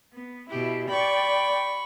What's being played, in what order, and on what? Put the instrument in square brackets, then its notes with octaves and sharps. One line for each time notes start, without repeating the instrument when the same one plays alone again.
[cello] B3
[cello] B2 E4 [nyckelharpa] G4
[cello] D5 G5 [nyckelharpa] B5 C#6